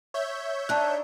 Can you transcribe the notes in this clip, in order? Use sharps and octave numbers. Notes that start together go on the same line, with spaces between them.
C#5 E5 G6
D4 D#4 A5 F#6